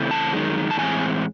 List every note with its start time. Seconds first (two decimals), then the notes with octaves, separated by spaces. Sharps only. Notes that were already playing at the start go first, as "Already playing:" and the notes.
Already playing: C#3 E3 A3 C4
0.11 A5
0.33 F#2 D#3 G#3
0.71 A5
0.78 A2 E3 G#3 C4 G#5